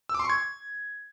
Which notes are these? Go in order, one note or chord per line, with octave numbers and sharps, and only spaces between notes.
E6
D6
C6
C#6
G#6